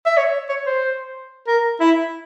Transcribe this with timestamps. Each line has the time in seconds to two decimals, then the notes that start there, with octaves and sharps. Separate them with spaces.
0.06 E5
0.17 C#5
0.49 C#5
0.66 C5
1.47 A#4
1.80 E4